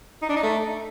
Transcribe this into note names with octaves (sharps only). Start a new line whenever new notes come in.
D#4
D4
D#4
A3